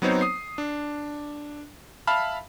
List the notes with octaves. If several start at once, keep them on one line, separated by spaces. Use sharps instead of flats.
F#3 B3 C4 D#4 C5 C#5
D#6 C7
D4
E5 F5 A5 B5 F6